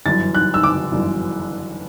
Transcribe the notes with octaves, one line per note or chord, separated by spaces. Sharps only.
G1 F#2 E3 A6
F#6
E6
D6
G1 F#2 E3